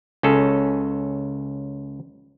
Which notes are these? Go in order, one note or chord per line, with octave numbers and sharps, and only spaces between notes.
C#2 C#4 G#4 A4